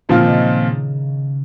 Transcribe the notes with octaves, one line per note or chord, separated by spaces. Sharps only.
A#2 C#3 F3 C4 F4
D#3
C#3